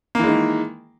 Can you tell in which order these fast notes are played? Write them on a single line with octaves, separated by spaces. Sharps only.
A#3 E3 G#3 D#3